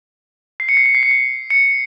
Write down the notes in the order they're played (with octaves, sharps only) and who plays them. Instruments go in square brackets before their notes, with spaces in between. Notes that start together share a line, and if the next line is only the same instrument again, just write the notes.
[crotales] C7
C#7
C7
C#7
C7
C#7
C7
C#7